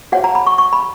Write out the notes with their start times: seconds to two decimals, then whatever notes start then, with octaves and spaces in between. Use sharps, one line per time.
0.12 F#4 C#5 F#5
0.24 A#5
0.35 B5
0.47 C#6
0.58 C#6
0.73 B5